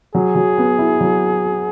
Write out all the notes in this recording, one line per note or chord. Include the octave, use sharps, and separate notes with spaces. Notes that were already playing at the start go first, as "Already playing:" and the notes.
F#3 G#4
F#3
B3
E4
F#3